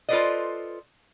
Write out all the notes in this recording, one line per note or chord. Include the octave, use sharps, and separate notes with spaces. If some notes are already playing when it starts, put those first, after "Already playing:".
F4 A4 B4 C5 D5 D#5